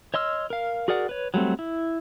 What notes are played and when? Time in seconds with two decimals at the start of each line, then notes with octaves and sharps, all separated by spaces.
0.14 C#5 D#5 C6 E6 F6
0.50 A#4 F5
0.88 F#4 G#4 A#4 D5 F#5
1.09 B4 C#5
1.34 F#3 G3 A3 C4
1.59 E4